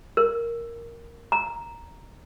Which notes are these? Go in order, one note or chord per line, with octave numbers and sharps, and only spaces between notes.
A#4
A#5